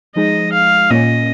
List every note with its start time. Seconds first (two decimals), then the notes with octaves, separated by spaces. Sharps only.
0.16 F3 G#3 D#4 G#4 D#5
0.53 F5
0.90 A#2 A#3 C#4 D#5